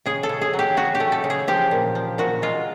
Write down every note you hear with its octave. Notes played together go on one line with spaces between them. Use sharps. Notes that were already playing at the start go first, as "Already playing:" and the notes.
C#3 G#4
A4
C#3
G#4
F#3
G4
C#3 F#4
G4
A3
A4
C#3
G#4
F3 G4
A#2
F3
A#2 F#4
G#3 F4